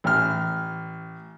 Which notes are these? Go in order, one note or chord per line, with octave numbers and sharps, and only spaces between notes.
A1 F6